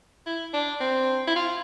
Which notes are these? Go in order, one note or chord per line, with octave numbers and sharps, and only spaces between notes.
E4
D4
C4
E4
F4